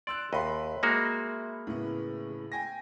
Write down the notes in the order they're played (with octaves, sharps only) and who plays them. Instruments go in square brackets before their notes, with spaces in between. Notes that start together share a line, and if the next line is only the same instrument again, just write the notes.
[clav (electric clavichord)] D5 [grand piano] C6 E6 F#6
[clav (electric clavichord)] D#2 D#5 [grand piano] E5 B5 C6
[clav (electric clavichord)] G#3 A#3 F#4
[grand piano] A2 C#3 B3
G5 G#5 A#6